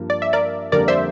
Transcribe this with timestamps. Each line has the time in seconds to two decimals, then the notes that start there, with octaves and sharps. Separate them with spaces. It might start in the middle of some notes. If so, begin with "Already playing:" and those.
Already playing: G2 F3 A#3
0.10 D5
0.22 E5
0.33 A#4 D5
0.72 F2 D3 G3 A#3 A#4 D5
0.88 C5 E5